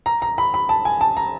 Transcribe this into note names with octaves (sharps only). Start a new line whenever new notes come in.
A#5
A#5
B5
B5
A5
G#5
A5
A#5